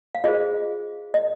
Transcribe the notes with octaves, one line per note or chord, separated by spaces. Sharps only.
F5
F4 G#4 C5 D#5
D#5